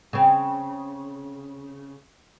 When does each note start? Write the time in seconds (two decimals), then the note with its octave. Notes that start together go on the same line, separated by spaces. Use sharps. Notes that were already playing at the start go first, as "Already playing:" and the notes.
0.13 C#3 C4